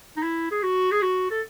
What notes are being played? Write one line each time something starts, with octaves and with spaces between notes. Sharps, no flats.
D#4
E4
G#4
F#4
G#4
F#4
A4